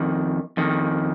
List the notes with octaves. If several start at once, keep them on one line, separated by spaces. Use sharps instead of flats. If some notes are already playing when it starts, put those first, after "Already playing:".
Already playing: F2 D#3
F2 D#3